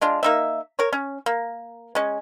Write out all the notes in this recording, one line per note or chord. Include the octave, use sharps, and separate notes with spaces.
G#3 D4 F4
A#3 D#4 E5
A#4 C#5
C#4
A#3
G#3 C#4